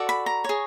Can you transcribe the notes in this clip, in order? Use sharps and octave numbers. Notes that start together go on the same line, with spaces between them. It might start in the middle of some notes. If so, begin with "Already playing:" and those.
Already playing: F#4 A4 D5
B5
A#5
G#4 C#5